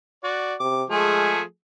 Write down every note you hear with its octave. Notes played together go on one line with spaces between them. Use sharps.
F#4 D5
C3 D6
F3 G#3 A3 G#4